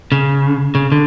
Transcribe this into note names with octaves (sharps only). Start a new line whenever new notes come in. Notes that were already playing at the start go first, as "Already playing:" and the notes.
C#3
C#3
D3